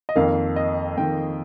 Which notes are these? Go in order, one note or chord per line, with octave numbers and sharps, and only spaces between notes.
D#5
F2 D#3 A#3 F5
D#5
F2 D#3 A#3 G5